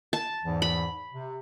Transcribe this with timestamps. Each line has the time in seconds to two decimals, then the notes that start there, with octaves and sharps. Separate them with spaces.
0.13 A5
0.44 E2 G#2 E3
0.62 B5
1.14 C3